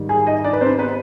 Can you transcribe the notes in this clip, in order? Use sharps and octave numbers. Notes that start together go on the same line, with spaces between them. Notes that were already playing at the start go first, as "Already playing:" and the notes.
Already playing: G#2 D#3 G3
G#4 G#5
D#4 D#5
D4 D5
B4
C4 C5
B3 B4